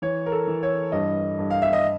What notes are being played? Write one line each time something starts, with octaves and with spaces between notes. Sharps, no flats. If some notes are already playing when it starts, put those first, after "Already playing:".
E3 C#5
A#4
A4
E3
C#5
G2 D#5
G2
F5
E5
D#5